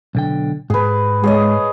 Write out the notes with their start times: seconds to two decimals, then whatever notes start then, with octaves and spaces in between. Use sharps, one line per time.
0.15 B1 D3 G5
0.70 G#2 G#4 B4
1.24 G#3 G#4 C#5 D#5